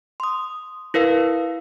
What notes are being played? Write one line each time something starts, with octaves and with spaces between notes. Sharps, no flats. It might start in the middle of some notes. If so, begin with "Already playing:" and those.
C6 D#6
E4 A#4 B4 F5